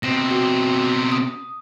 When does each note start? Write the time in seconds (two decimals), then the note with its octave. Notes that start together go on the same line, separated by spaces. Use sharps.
0.03 B2 C4 A#6
0.31 F#4
1.12 D#6